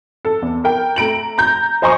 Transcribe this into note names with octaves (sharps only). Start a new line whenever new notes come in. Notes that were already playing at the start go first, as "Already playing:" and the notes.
A4
E2
A#4 G5
A3 A#5 D7 F#7
A#5 G6
C5 D#5 G#5 A#5 C6 C#6